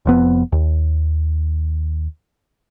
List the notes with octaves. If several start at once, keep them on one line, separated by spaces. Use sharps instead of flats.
F1 F2 B3
D#2